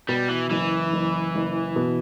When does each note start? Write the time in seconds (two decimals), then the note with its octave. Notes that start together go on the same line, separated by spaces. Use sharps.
0.09 B2 G3
0.29 E3
0.50 F#1 E3
0.93 F#1
1.35 F#1
1.76 B2